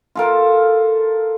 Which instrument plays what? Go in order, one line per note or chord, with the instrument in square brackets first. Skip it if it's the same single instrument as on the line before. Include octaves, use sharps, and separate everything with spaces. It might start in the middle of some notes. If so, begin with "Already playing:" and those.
[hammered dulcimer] F4 A4 A#4